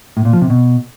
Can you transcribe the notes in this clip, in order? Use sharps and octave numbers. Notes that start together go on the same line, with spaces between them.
A2
A#2
F3
C3
B2